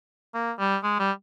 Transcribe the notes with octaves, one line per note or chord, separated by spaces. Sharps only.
A#3
G3
G#3
G3